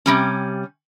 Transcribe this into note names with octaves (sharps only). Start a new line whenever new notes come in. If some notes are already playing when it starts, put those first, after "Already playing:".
C3 G3 C#4